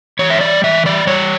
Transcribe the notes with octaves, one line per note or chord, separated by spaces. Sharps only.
E3 C#5
E5
G3 D5
E3 E5
G3 D5
G3 C#5